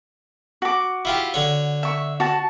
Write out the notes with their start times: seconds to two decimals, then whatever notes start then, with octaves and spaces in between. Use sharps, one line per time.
0.62 F#4 D6
1.05 E4 F4 G4
1.34 D3 C#5
1.83 E5 C#6
2.20 F#4 A5